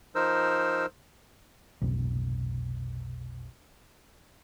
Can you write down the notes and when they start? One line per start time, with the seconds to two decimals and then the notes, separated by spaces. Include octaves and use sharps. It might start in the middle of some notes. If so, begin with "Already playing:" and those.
0.15 F3 D#4 A#4 C5 E6
1.82 F1 B1